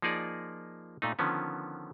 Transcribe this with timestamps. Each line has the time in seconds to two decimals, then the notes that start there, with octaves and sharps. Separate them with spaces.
0.02 F3 A#3 D#4 G#4 D5
1.02 A#2 A3 D#4
1.19 D3 D#3 F3 B3 C#4